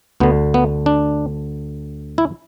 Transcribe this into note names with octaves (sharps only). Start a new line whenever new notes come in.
D2 D3 B3
B3
D4
E4